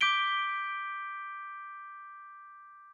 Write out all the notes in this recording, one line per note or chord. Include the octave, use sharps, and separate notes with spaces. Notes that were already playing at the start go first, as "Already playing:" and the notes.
D6 G6 B6 D7 G7